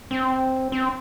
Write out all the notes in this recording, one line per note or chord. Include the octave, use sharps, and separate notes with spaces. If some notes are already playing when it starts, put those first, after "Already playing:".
C4
C4